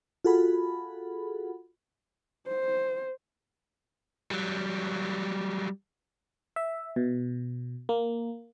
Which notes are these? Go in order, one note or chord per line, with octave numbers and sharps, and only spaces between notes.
F4 F#4 G#4 A4 F#5 B5
C5
F#3 G3
E5
B2
A#3